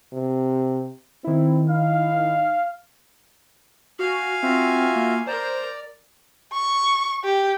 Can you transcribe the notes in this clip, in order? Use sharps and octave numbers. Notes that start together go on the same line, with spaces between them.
C3
D#3 C4 E4
D#4 F5
F#4 F5 G#5
C4 F4 F#4 E5
A#3
A#4 C5 D5 A#5
C#6
G4